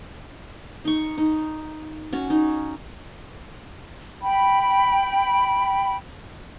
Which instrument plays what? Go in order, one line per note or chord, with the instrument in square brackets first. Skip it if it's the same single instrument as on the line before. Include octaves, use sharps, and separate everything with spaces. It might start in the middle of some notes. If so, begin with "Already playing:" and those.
[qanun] D#4 C#6
D#4
C#4 F#4
D#4
[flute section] G5 B5